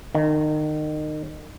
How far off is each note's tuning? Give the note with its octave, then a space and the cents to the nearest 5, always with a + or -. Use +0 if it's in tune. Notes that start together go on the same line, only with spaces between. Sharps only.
D#3 -30